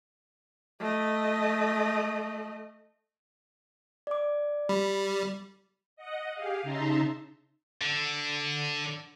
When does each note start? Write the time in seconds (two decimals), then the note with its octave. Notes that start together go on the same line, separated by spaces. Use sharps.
0.79 A3 D#5
4.07 D5 D6
4.69 G3 B5
5.96 D#5 F#5
6.33 G4 G#4 F5
6.63 C#3 D#4 E5 A5 A#5 C6
7.81 D3